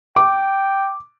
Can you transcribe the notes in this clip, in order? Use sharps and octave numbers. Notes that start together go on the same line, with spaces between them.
G5 D6